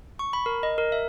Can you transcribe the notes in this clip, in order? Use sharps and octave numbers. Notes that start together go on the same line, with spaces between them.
C#6
B5
A#4
D#5
A#4
E5